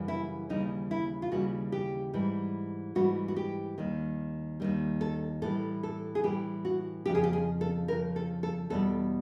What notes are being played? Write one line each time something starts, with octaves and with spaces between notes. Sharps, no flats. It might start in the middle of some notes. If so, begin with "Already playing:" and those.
Already playing: F#2 C#3 E3 G3
E4
D#2 C#3 E3 G3 D#4
E4
F4
D#2 C#3 E3 G3 F#4
G4
G#2 E3 G3
G#2 E3 G3 F#4
F#4
G4
D#2 D#3 G3
D#2 D#3 G3
A4
A2 E3 G3 A4
A4
G#4
A2 E3 G3 G4
F#4
F2 C#3 F3 G4
G#4
G4
G#4
A4
F2 C#3 F3 A#4
A4
A4
E2 B2 G3 A4